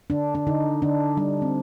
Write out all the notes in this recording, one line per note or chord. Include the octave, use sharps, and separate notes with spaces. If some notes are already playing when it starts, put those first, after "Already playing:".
D3 D4
D4
D3 D#4
D3 D4
G3 D4
C4